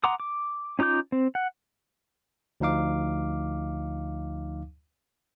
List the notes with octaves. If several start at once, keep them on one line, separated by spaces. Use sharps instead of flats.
F#5 A#5 C6 D6 D#6
D6
C#4 D#4 F4 D6 G6
C4
F#5
D2 F3 D#4 F5 D6